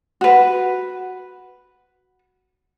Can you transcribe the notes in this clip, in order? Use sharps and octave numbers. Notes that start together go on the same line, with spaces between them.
F#4 B4